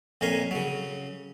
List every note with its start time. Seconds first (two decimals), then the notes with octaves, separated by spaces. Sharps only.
0.21 F2 A#2 C#4 A#4 G#5 C6
0.51 C#3 F#3